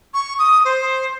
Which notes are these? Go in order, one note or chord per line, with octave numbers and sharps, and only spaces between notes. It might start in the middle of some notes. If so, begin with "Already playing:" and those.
C#6
D#6
C5